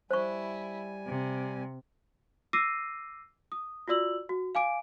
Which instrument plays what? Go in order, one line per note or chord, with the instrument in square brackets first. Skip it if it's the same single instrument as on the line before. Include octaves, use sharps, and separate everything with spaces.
[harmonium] G3 G#5 [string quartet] E4 [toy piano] C5 C#6
[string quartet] C3
[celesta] D6 E6 A#6 C7 D#7
D#6
F4 F#4 D5 E6 F#7
F#4
F5 G#5 D6 D7